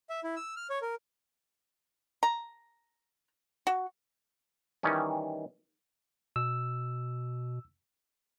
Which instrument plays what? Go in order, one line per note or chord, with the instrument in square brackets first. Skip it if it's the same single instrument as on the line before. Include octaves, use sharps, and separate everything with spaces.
[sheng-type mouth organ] E5
E4
E6
F6
C#5
A#4
[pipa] A#5
F#4
[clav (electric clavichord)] D#3 E3 G3 C#4
[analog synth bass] B2 [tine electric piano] E6